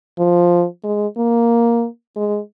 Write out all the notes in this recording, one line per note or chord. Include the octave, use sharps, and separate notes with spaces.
F3
G#3
A#3
G#3